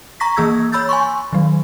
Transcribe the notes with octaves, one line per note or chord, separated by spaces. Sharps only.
A#5 C#6 A#6 B6
E3 A#3 G#4 E6 G#6
C#5 B5 E6 G6 A6
G#5 C6 C#6
D#3 F#3